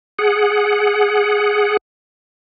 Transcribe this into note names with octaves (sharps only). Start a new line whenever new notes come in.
G#4 F#5